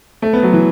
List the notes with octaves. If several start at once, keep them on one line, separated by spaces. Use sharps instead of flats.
A3
B3
F#3
E3